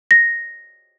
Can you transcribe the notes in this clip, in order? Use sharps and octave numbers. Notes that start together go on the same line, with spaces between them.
A#6